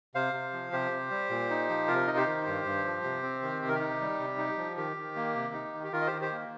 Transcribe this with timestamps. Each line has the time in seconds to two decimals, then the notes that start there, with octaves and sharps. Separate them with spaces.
0.15 C3 C5 F5
0.34 C3
0.53 F3
0.72 C3 G4 C5
0.91 C3
1.11 G3
1.30 A#2
1.50 D#4
1.69 F3
1.88 C3 F4 A#4
2.07 D#4 D#5
2.17 G4 C5
2.26 D#3
2.47 G2
2.65 G2
2.85 F3
3.04 C3
3.23 C4
3.42 D#3
3.61 C3 G4
3.68 A#4
3.75 G4
3.80 D#4
4.01 G3
4.20 C3
4.38 D#4
4.57 F3
4.77 D#3 G4
4.97 D#3
5.16 A#3
5.35 C3
5.53 D#4
5.74 D#3
5.84 G4
5.92 D#3 F4 A#4
6.01 D#5
6.07 D#3 G4 C5
6.21 G4 C5
6.32 A#3